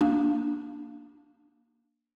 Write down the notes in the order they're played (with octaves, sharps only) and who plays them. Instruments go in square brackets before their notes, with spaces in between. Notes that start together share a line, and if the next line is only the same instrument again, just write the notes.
[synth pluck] A#3 D4